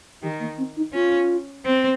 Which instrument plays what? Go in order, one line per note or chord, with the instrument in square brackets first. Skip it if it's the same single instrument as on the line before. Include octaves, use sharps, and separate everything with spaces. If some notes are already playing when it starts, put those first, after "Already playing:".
[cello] D#3 [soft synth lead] G4
[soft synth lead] A#3
C4
D#4
[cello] C#4 [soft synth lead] F4
[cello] C4